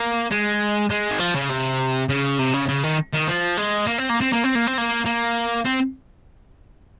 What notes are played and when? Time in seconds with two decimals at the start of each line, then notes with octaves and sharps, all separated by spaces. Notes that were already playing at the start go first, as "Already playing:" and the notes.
Already playing: A#3
0.31 G#3
0.90 G#3
1.11 D#3
1.20 F3
1.35 C#3
1.50 C3
2.09 C#3
2.39 C3
2.54 C#3
2.68 C#3
2.83 D#3
3.13 D#3
3.28 F3
3.57 G#3
3.87 A#3
3.98 C4
4.10 A#3
4.21 C4
4.33 A#3
4.44 C4
4.55 A#3
4.67 C4
4.78 A#3
5.06 A#3
5.65 C4